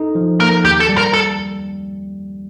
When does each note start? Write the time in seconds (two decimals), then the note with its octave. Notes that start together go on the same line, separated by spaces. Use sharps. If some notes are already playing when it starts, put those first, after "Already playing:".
Already playing: D#4 A4
0.15 F3
0.40 A#3 A#4
0.64 D#2 G4
0.80 A4
0.89 G3
0.97 A#4
1.13 A4